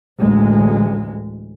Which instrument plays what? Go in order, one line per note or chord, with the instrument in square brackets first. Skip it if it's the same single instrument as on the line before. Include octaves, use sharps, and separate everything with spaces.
[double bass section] A1 D2 G#3